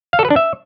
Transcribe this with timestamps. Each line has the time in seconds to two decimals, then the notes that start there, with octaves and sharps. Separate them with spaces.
0.13 F5
0.19 A4
0.25 B4
0.30 D4
0.36 E5